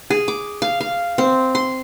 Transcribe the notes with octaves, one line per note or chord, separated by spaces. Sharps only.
G#4
D6
F5
F5
C4
C6